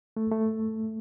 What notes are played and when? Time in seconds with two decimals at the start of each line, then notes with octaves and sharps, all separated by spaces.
0.17 A3
0.32 A3